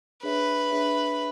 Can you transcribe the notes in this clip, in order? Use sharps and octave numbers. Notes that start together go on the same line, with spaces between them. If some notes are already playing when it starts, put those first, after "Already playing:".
D4 G#4 B4 C#5 E5
D4 G#4 C#5 E5